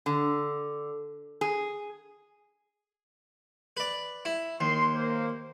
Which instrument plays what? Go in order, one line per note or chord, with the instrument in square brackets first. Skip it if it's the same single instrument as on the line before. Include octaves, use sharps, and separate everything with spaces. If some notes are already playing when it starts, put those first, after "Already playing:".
[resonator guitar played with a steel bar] D3
G#4
[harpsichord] B4 D5
E4
[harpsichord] D#2 [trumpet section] C6
[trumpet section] A#3 C5